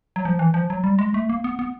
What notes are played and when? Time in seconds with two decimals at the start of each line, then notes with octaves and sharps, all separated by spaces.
0.16 F#3
0.25 F3
0.39 E3
0.54 F3
0.70 F#3
0.84 G3
0.99 G#3
1.14 A3
1.29 A#3
1.44 B3
1.59 B3